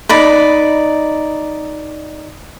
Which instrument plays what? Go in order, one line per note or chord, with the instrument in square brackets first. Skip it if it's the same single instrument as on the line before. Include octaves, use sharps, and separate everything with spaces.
[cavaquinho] D#4 D5 B5